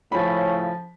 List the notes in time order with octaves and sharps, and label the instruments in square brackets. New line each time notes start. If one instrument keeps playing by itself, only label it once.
[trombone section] A2 C#3 C#4 [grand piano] F3 B5